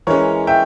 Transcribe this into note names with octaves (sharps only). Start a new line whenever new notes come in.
E3 G#3 C#4 A#4 C#5
E5 G5